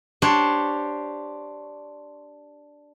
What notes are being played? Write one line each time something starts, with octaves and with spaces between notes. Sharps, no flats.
D4 G4 C5 C#5